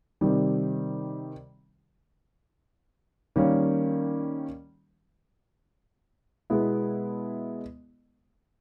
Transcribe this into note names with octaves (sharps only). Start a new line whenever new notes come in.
C3 D#3 G3
D#3 G3 A#3 C#4
B2 G#3 B3 E4